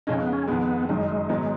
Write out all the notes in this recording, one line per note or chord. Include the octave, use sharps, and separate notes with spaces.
F2 C#3 G#3 C#4 D#4
B3
C#4
F2 D#3 G#3 B3
F#1 F#2 D#3 G#3
G#2 D#3 F#3 B3